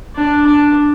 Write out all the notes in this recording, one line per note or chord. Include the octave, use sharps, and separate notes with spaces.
D4
D4